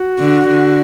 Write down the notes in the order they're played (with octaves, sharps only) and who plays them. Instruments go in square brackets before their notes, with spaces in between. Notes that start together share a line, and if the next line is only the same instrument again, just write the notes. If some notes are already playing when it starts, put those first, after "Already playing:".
Already playing: [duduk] F#4
[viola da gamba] D3
D3